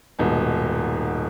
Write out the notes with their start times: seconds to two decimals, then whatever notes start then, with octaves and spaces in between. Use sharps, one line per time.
0.19 D#1 G#2 B2